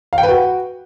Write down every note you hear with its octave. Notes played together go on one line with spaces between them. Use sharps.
F5
G5
B4
F#4